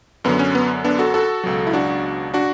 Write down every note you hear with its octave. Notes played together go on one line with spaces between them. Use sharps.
F#2 D3 F#3 B3
C#4
B3
B3 D4
F#4 A4
F#4 A4
C#2 B2 F#3
E4
D4 F#4
D4 F#4